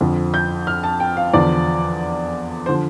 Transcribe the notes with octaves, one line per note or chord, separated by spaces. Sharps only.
F2 D3 F3
G6
F6
A5
G5
F5
E2 D3 F3 D5
D3 F3 C5